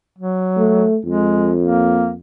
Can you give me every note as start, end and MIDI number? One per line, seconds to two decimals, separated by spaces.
0.18 0.88 54
0.58 0.98 57
1.05 2.19 41
1.05 1.51 56
1.61 2.11 58